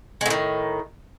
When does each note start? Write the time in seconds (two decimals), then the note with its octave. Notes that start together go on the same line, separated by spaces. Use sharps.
0.21 G#3
0.26 A2
0.30 D#3